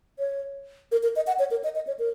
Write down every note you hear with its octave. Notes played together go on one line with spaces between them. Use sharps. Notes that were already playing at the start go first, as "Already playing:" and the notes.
C#5
A#4
A#4
D#5
F#5
C#5
A#4
D#5
D#5
C#5
A#4